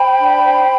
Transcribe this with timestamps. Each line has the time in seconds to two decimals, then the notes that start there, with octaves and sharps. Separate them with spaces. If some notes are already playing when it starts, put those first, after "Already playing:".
Already playing: C5 G5 B5
0.18 D4
0.43 C5